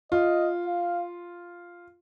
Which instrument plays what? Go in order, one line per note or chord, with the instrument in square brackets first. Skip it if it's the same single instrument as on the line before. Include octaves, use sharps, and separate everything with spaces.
[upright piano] F4 [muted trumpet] D#5
[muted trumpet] F5